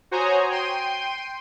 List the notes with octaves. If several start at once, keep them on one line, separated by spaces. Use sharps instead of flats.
F#4 C5 C#5 G#5 A#5 D#6
G5 C6 D#7